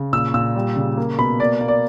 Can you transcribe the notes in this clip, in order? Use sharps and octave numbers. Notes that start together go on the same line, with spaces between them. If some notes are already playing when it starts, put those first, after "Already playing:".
Already playing: C#3
A#2 E6
A#2 E6
G3
C#3
A#3
B2 B5
A#3 D5
A#3
D5